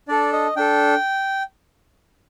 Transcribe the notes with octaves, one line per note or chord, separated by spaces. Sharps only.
D4 A4 D5
D#5
D4 A4 G5